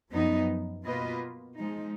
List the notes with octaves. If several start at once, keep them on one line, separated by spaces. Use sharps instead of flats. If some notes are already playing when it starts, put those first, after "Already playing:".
F#2 F3 B3 D#4
B2 A#3 F4 B4 D#5
F3 G#3 D#4